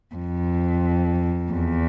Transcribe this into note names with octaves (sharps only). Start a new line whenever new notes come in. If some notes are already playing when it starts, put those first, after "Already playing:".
F2
E2